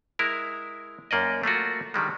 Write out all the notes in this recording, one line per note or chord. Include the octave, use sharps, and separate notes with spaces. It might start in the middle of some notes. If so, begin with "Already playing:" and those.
G#3 E4 A#4
F#2 A#3 D5 D#5
A3 A#3 F4 F#4
D3 D#3 G3 G#3